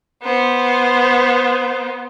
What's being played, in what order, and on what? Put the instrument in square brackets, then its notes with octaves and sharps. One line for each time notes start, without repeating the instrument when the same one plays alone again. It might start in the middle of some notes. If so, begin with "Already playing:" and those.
[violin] B3 C5